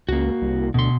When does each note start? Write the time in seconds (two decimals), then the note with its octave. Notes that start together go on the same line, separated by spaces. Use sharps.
0.09 C#2 A#3 F#4
0.42 C2
0.74 D2 B2 C6